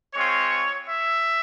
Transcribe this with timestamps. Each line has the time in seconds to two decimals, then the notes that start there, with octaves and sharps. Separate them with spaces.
0.14 G#3 C4 F4 C#5
0.87 E5